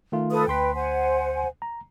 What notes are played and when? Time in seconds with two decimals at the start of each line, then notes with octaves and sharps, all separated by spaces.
0.12 D#3 A3 F4
0.31 A4 B4 D#6
0.48 D2 B4 G5 C6 B6
0.75 C5 F#5 G#5
1.62 A#5